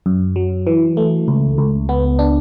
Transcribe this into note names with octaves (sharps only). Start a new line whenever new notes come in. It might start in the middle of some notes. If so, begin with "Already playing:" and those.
F#2
F#3
E3
A3
C#2
C#2
B3
D4